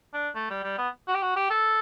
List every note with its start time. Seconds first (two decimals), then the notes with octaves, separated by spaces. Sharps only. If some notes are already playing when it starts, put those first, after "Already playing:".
0.14 D4
0.35 A3
0.50 G3
0.64 G3
0.78 B3
1.08 F#4
1.15 G4
1.22 F#4
1.36 G4
1.50 A4